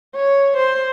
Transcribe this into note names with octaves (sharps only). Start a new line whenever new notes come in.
C#5
C5